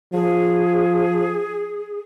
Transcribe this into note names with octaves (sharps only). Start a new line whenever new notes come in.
F3 G#4